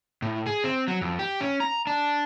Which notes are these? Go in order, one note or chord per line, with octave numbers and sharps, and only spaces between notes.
A2
G#4
C4
F#3
F2
G4
C#4
A#5
D4